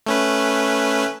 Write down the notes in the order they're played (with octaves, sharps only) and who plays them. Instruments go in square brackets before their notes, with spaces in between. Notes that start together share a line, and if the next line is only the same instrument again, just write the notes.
[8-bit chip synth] A3 C#4 B4